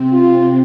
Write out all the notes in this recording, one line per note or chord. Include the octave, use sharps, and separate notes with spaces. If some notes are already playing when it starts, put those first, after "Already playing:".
Already playing: C3 C4
F4